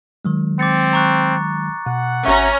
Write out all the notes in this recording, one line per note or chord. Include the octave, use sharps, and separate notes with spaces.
D#3 F#3 G#3
C4 D6 A6 C#7
A#5 C#6 F#6
B2 F#5
G#1 C#4 E5 A#5 C#6